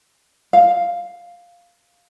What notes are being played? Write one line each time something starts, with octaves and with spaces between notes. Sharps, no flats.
F5